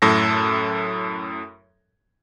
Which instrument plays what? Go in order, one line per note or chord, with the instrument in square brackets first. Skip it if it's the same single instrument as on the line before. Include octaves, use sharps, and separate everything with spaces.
[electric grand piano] F#2 A2 A4 A#6